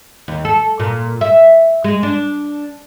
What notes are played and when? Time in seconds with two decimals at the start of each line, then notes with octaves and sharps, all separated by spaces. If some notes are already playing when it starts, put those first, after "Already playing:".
0.28 D#2
0.45 A4
0.80 A#2
1.21 E5
1.84 G#3
2.03 D4